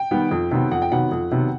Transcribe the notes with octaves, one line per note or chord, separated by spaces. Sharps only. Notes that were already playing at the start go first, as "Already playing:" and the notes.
Already playing: G5
D#3 G3 B3
F2
C3 D#3 F#3 B3
F2 F#5
G5
C3 D#3 F#3 B3 F#5
F2
C3 D#3 F#3 B3